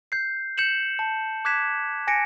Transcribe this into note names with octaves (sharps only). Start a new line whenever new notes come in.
G6 C7
G6 C#7 E7 F#7
A5
D6 F#6 G#6 B6 E7
G#5 A#6 C#7 D7